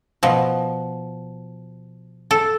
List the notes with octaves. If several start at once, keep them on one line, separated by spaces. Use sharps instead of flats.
B2 F3
A4